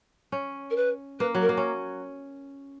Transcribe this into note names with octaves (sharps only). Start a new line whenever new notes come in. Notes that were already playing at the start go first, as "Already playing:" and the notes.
C#4
A#4
B4
A#3 B4
F#3
A#4
A#3
C#4